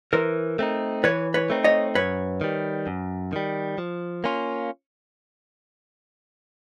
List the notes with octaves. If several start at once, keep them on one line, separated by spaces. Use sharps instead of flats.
E3 A#4 C5
A3 C4 D#4
E3 B4 C#5
B4 C#5
A3 C4 D#4
C#5 D#5
F#2 B4 C#5
D#3 G3
F#2
D#3 G3
F3
A#3 C#4 F4